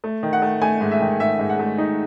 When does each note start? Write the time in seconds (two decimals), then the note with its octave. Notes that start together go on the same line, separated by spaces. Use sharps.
0.04 A3
0.23 D#3
0.33 F#5
0.42 A3
0.62 A3 G#5
0.81 G#2
0.91 E5
1.00 D#3
1.20 G#2 E5
1.39 G#2
1.50 F#5
1.59 A3
1.78 D#4